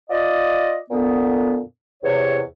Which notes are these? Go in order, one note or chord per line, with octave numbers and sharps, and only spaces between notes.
F4 D5 D#5
F2 A#2 D3 B3
E2 C3 C#5